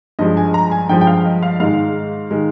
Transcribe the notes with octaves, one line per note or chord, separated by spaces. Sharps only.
G2 F3 G#3 D#5
G#5
A#5
G#5
G2 F3 G#3 G5
G5
F5
D#5
F5
G#2 D#3 G#3 F5
D#3 G#3